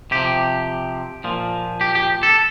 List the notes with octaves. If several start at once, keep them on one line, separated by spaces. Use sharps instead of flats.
C3 F3 G4
A#2 F3
G4
G4
A4